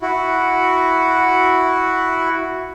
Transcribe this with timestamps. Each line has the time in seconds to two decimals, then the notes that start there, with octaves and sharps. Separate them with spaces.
0.02 E4 F#4